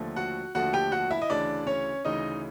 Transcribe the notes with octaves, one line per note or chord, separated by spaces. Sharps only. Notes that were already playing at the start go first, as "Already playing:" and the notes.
Already playing: D#2 D3 F3 A3
F#4 F#5
D#2 D3 F3 A3 F#4 F#5
G4 G5
F#4 F#5
E4 E5
D#5
D2 C#3 E3 D4 D5
C#4 C#5
D2 C#3 E3 D#4 D#5